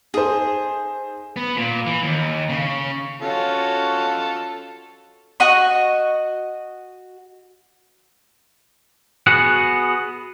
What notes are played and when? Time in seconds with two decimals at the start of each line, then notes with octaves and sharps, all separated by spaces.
0.14 D#4 G#4 A4 C5
1.36 B3
1.57 A#2
1.86 E3
2.03 D#2
2.49 C#3
3.22 C#4 F4 F#4 A4
5.40 F#4 D#5 C#6
9.27 B3 F#4 G#4 F#5